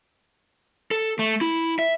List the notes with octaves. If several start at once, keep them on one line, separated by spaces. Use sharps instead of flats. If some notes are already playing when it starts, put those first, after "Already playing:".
A4
A3
E4
E5